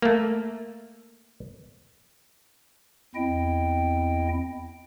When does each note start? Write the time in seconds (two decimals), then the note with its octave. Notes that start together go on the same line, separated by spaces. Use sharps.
0.02 A3 A#3
3.15 E2 C4 E4 D#5 G5